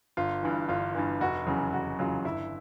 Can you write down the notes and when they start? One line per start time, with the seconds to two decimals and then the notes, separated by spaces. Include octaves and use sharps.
0.17 G1 F4
0.43 G2 E3
0.69 G1 F4
0.95 G2 E3
1.20 F1 F#4
1.46 E2 C#3 F#3
1.73 F1 F#4
1.99 E2 C#3 F#3 F4
2.25 G1 E4